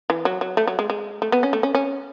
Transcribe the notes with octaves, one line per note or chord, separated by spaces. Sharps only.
E3
F#3
F#3
A3
F#3
G#3
G#3
A3
B3
C#4
A3
C#4
C#4